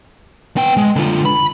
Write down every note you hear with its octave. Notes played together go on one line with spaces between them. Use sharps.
B3 G5
G#3
D3 F4
B5